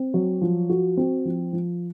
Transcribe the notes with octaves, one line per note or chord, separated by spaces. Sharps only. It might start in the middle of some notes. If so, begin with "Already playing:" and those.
Already playing: C4
F#3
F3
F#4
C4
F3
F3